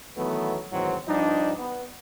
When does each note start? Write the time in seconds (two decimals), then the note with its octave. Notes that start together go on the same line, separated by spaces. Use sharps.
0.17 D#3 E3 F#3 A3 B3
0.73 D2 G#2 D#3 E3 F#3 C4
1.08 G2 F3 G3 D4 D#4
1.58 B3